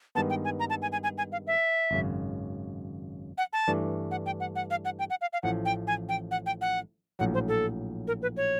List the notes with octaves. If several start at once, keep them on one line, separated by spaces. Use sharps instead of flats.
G2 D#3 G#3 B3 A5
G5
G#5
A#5
A5
G#5
G#5
G#5
G#5
F5
E5
G#1 F#2 C#3
F#5
A5
G2 E3 A3 D4
F#5
G5
F#5
F#5
F5
F#5
G5
F#5
F5
F5
A1 A2 F3 F#5
G5
G#5
G5
F#5
G5
F#5
A#1 A2 F#3 F#5
C5
A4
A#4
B4
C#5